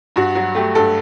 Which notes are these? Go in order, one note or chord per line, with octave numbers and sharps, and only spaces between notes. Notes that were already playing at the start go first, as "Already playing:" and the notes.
G2 F#4
F#3 F#4
A3 G4
G2 A4